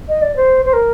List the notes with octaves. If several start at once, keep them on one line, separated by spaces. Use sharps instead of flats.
D#5
D5
C5
C5
A#4